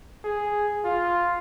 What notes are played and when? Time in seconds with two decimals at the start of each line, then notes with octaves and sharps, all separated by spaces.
0.24 G#4
0.85 F4